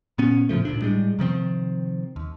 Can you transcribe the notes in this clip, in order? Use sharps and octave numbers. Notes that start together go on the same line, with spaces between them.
A#2 B3 C#4
A2 C#3 F3 A3
G#1 D2 A#2 D4
A2 G3 G#3
C3 D#3 F3 C4
D#2